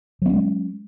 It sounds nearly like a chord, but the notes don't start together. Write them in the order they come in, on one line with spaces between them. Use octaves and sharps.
F#3 B3 C#4 G#3